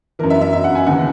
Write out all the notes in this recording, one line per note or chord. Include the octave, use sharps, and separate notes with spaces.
F#2 E3 A#4
E5
E5
E5
F#5
G#5
D#2 C#3 E3 F#5